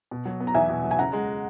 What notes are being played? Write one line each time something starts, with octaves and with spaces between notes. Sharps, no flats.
B2
F#3
B3
A#5
E2 E5 G#5
B2
F#3
G#5
C#3 F#5 A#5
G#3